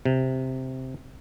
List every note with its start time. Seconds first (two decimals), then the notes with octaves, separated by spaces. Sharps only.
0.05 C3